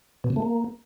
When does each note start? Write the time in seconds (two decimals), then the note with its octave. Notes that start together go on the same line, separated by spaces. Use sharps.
0.24 B2
0.30 C3
0.36 A3
0.42 A#3